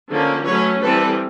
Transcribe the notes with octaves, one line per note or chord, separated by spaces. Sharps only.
D3 F3 A#3 C#4
F#3 A3 C#4 B4 C#5
E3 G3 C4 A4 B4